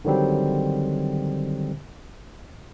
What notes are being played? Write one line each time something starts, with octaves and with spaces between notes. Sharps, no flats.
D3 D#3 F#3 G3 C4